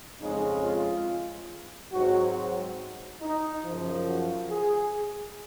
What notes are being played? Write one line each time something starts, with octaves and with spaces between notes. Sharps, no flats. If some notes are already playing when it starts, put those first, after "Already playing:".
F2 C#3 G#3 C4 D#4
F4
G#2 F#3 C4 F#4
D#4
F#2 C#3 F3
F#4
G#4